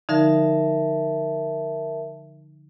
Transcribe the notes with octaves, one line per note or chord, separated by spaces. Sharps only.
D3 F3 D#4 A#4 E5 A5